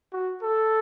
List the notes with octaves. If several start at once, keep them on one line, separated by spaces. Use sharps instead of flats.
F#4
A4